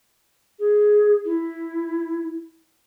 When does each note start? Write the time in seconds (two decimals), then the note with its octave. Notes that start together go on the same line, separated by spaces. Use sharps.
0.59 G#4
1.25 E4